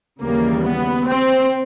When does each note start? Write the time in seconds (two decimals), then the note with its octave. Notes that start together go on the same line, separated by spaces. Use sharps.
0.22 D#2 C#3 E3 G3 A#3
0.64 B3
1.07 C4